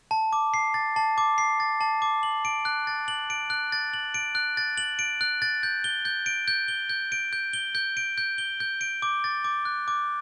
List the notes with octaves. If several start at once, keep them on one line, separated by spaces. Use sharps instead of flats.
A5
D6
C7
A6
A5
D6
C7
A6
A5
D6
F#7
D7
F#6
A6
F#7
D7
F#6
A6
F#7
D7
F#6
A6
F#7
D7
F#6
A6
G6
G7
G6
D7
G6
G7
G6
D7
G6
G7
G6
D7
G6
G7
G6
D7
D6
A6
D6
F#6
D6